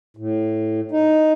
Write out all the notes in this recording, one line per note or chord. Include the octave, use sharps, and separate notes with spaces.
A2
D#4